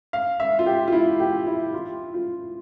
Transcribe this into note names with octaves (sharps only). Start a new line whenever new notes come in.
F5
E5
F4
G4
F4
E4
G4
E4
F4
F4